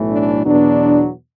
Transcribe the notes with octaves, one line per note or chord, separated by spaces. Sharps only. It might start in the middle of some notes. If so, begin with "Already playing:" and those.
Already playing: B1 A2 E3 A3
D4
E2 B2 F#3 B3 D4